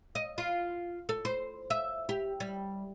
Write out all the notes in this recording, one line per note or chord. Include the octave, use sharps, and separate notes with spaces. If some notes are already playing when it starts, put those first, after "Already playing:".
D#5
F4
A4
C5
E5
G4
G3